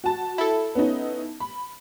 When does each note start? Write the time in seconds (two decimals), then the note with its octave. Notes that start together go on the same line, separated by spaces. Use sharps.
0.04 F#4 A5
0.38 E4 A4
0.75 B3 C#4 D#4
1.40 B5